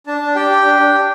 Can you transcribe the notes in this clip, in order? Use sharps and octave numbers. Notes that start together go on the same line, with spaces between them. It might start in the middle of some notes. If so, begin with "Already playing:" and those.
D4 A5
D4
G4 G5
G4
D4
D4
G4